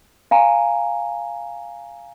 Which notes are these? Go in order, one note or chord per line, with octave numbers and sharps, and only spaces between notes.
F5 G#5 A#5